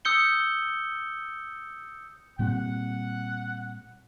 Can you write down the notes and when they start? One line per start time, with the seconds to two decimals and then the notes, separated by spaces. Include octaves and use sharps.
0.05 D#6 E6 G6 C#7 G7
2.39 A#2 G3 C4 F#5